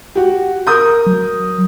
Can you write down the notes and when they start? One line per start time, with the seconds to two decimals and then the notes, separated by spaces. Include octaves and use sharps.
0.15 F#4 G4
0.67 A#4 D#6 G6
1.06 F#3